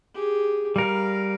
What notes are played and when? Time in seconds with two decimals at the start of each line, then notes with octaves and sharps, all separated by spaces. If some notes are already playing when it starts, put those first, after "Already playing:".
0.14 G4 G#4
0.76 G3 A#4 F5